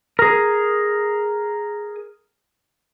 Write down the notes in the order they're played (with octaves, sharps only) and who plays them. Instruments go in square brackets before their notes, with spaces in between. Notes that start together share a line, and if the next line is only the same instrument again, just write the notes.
[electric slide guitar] G#4 A#4